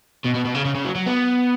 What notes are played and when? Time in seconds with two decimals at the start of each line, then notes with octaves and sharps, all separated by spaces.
0.24 B2
0.35 B2
0.45 B2
0.55 C#3
0.65 C#3
0.75 C#3
0.85 F#3
0.95 F#3
1.06 B3